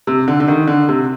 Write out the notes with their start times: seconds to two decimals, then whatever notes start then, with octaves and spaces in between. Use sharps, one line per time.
0.07 C3
0.28 D3
0.40 D3
0.48 D#3
0.67 D3
0.89 C3